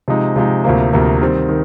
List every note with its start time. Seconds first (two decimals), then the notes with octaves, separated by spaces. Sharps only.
0.08 C3 F3 G#3 D#4
0.36 C3 F3 G#3 D#4
0.64 D2 C3 F3 A#3
0.93 D2 C3 F3 A#3
1.21 D#3 G3 C4
1.49 D#3